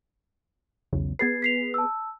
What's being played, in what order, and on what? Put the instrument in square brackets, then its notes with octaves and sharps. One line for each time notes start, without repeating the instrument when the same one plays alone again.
[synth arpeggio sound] B1 E2 C#3
[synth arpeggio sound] B3 G#4 B4 [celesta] G#6 A6 C7
[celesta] B6 C7 F7
A5 E6